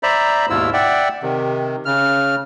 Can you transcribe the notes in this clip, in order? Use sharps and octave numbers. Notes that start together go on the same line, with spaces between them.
C5 D5 E5 A#5 B5
D#2 G#2 B2 E4 F4 E6
D5 E5 F#5 G5
C3 D#3
C#3 F6